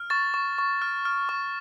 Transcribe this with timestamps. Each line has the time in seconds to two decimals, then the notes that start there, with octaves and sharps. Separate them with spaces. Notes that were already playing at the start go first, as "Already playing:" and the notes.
Already playing: F6
0.10 C#6 A6
0.34 C#6
0.58 C#6
0.82 F6
1.05 F6
1.29 C#6